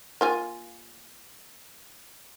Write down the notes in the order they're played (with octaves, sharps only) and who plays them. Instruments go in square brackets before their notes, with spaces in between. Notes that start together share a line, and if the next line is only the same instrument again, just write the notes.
[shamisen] A#3 F4 G#5